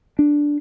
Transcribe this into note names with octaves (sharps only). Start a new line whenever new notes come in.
D4